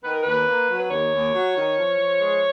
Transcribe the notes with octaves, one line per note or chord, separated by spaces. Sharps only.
D#3 B4
A#4
D#2 B4
A#3
F#3
B4
D#2 C#5
D#2
F#3
D#3
F3
F3
G#3